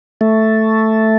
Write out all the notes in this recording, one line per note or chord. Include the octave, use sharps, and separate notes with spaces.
A3